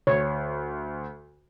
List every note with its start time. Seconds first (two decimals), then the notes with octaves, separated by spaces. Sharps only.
0.07 D2 C#5